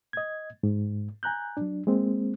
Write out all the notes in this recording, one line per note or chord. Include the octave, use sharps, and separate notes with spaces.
D#5 G#6
G#2
G#5 A#5 F#6 G6
F#3 D4
G#3 A#3 C4